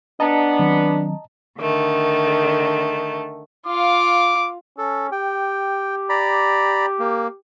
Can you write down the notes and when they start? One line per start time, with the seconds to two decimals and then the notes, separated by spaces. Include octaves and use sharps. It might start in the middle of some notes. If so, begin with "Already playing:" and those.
0.20 B3 D4 D#5 A5 A#5
0.59 D#3 F#3 C4
1.59 D3 D#3 A3
3.67 F4 F5 D6
4.78 C#4 A4
5.12 G4 G5
6.09 D5 A#5 B5
6.99 A#3